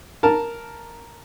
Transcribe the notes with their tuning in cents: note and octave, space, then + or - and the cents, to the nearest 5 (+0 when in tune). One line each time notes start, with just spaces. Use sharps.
A#4 +0 A5 +0